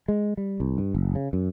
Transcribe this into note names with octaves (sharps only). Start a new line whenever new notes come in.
G#3
G3
C2
G2
F#1
C#3
F#2